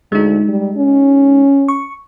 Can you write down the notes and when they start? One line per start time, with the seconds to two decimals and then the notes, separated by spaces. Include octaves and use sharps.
0.12 D2 G#3 D#4
0.48 G3
0.77 C#4
1.68 C#6